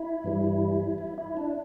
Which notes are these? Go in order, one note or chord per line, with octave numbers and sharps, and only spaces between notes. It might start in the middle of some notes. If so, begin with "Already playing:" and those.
Already playing: E4
G2 E3 G3
E4
E4
D4